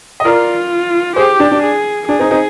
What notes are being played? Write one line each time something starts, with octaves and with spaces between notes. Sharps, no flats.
D#5
F4 A#4 D5
G4 G#4 C5
D4
D4
G#4
D4 G#4
C4 D#4
C4 D#4